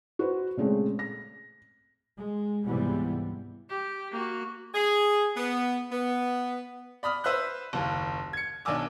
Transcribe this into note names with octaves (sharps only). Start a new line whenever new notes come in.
F#4 B4 C5
A#2 C#3 G#3 A3 C4
A#6
G#3
C#2 G#2 C3 E3 G3 B3
G4
A#3 F#4
G#4
B3
B3
D5 B5 D#6 F6
B4 C5 E5 E6 F#6
F#1 D#2
G#6 C#7
B1 D#3 D4 G#5 D6 E6